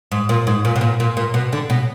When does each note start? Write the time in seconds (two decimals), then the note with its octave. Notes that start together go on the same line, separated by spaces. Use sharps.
0.12 G#2
0.29 A#2
0.47 G#2
0.65 A#2
0.76 B2
0.81 A#2
1.00 A#2
1.17 A#2
1.34 B2
1.53 D3
1.70 B2